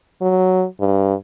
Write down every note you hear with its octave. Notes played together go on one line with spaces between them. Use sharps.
F#3
G2